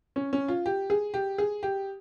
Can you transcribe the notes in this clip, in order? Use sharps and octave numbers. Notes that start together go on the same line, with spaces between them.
C#4
C#4
F4
G4
G#4
G4
G#4
G4